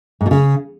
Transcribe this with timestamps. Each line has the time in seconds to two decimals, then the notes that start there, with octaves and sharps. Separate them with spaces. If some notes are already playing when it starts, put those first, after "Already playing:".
0.21 G#2
0.26 B2
0.31 C#3